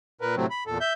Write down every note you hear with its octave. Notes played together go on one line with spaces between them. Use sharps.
A#2 A#4 B4
A2 C3 F#3 A3 C4
B5
E2 A#2 A4
E5 G6